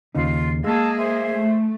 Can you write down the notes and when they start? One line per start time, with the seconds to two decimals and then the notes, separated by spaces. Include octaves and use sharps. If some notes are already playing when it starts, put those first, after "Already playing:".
0.15 D#2 C#3 D#4 F4
0.64 G#3 A#3 G#4 F5 A5 E6
0.96 C5 E5
1.34 A3